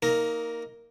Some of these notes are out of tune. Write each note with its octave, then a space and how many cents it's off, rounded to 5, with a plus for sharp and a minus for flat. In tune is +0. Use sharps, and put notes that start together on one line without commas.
A#3 +0 D#4 +20 A#4 +0